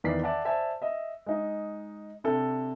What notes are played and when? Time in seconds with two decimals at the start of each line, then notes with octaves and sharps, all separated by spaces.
0.04 E2 D#3 E3 D5 B6 C7
0.23 D5 E5 F#5 G#5 A5
0.45 C5 D5 E5 G#5 A5
0.82 D#5 E5
1.26 G#3 D#4
2.24 C3 D4 A4